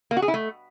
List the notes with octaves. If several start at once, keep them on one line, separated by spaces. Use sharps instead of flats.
A#3
F#4
G#4
E4
A3